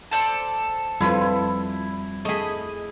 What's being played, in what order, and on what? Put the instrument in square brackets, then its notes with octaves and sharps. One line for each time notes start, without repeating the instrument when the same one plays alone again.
[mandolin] A4 C5 D5
[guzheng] F2 F4 B4 [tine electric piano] G3 [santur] E4
[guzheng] A3 G#4 [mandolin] D#5 B5